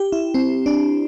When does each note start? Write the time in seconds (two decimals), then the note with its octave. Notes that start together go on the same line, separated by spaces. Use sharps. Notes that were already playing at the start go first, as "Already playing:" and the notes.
Already playing: G4
0.12 E4
0.34 C4
0.66 D4